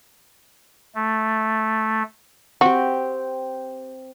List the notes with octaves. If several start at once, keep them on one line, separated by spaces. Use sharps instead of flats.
A3
C4 F#4 G4